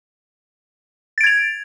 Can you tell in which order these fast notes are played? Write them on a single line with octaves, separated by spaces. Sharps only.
A6 D7 G#6 F7